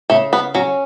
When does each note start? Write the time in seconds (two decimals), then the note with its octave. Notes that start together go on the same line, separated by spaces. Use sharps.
0.10 C#3 A3
0.33 B3
0.55 F#3 C#4